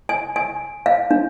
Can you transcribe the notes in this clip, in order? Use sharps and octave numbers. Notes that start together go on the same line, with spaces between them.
G#5
G#5
F5
D4